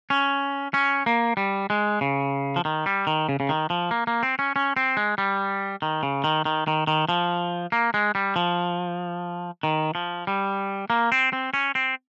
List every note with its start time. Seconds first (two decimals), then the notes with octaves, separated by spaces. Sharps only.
0.10 C#4
0.74 C#4
1.06 A#3
1.37 G3
1.70 G#3
2.01 C#3
2.56 F3
2.65 D#3
2.86 G3
3.07 D#3
3.29 C#3
3.40 C#3
3.49 D#3
3.70 F3
3.91 A#3
4.07 A#3
4.23 C4
4.39 C#4
4.56 C#4
4.77 C4
4.97 G#3
5.18 G3
5.82 D#3
6.03 C#3
6.24 D#3
6.45 D#3
6.67 D#3
6.87 D#3
7.09 F3
7.72 A#3
7.94 G#3
8.15 G3
8.36 F3
9.63 D#3
9.95 F3
10.27 G3
10.90 A#3
11.12 C4
11.33 C4
11.54 C#4
11.75 C4